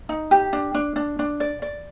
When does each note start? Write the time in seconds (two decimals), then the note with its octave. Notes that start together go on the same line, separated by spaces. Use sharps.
0.09 D#4
0.31 G4
0.53 D4
0.74 D4
0.96 D4
1.19 D4
1.40 D5
1.62 D5